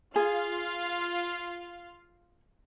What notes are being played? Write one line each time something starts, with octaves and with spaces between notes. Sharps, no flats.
F4 G#4 F5